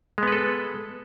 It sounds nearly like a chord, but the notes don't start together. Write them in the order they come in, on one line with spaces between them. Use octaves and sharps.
G#3 B3 B4 A4